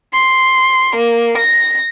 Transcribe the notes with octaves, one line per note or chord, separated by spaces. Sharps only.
C6
A#3
A#6